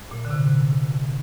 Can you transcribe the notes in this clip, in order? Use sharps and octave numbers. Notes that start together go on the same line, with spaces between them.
A#2
D3
C3